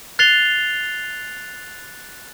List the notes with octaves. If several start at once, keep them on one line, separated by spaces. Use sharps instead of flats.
F#6 A6 C7 F7 G7